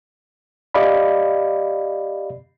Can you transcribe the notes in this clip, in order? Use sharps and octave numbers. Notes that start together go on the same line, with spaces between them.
G4 D5 D#5 F5 B5